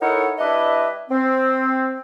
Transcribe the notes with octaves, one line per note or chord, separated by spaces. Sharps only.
D#4 E4 A4 A#4 C#5 F#5
G3 D4 E4 B4 D#5 E5
C4